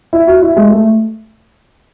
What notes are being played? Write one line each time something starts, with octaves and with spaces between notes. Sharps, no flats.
E4
F#4
E4
G#3
A3